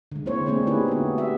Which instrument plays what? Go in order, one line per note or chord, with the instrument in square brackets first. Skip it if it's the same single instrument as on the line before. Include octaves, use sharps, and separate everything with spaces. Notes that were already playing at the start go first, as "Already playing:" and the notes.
[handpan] D3 G#3
A#3 C4 E4 C5 C#5
A3 A#3 C4 D4 E4 G#4
D3 D#4 E4 G4 G#4 B4
B3 F#4
F#4 G4 E5